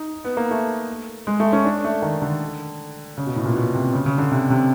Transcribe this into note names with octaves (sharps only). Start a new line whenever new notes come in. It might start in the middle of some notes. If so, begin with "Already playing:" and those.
Already playing: D#4
B3
A#3
A3
G#3
A3
C#4
D4
A3
D#3
D3
C#3
B2
A2
A#2
B2
C3
C#3
C#3
D3
C3
C3